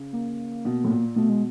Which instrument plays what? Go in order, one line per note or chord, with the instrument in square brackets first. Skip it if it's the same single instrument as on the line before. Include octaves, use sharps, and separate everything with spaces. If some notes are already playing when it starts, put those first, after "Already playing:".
Already playing: [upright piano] C#3
[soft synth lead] A#3
[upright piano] B2
A2
A#2
[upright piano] B2 [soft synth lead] A3
[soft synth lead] G#3